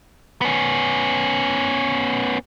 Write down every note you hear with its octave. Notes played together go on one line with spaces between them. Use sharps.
B3 C#4